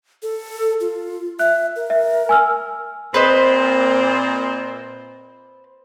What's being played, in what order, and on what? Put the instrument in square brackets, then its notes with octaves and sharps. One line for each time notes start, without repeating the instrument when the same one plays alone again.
[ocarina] A4
F4
[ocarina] E5 [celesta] F#6
[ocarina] A#4
[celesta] E5
G#5 E6 F6
[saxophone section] A#2 C4 [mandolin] B4 C5 D#5